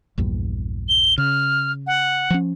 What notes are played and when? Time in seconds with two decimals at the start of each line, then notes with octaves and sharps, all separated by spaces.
0.18 A#1 E2 G2
0.89 G7
1.18 C#3 F6
1.87 F#5
2.30 F3 C#4